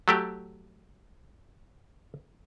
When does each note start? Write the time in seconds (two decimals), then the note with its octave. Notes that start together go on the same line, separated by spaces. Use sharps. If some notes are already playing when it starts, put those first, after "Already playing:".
0.08 F#3 A3 G4